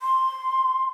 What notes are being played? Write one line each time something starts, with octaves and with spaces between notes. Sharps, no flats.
C6